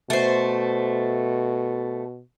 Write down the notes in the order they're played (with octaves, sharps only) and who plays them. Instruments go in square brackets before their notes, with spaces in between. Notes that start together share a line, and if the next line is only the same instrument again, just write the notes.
[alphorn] B2 [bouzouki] A3 C5